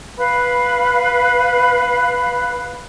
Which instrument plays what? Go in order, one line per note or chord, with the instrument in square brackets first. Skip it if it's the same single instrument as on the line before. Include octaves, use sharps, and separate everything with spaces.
[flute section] B4 F5 B5